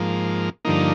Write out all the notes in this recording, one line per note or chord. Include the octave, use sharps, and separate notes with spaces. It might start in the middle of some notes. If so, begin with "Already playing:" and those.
Already playing: G#2 F3 A#3
G2 D3 F3 A#3 D#4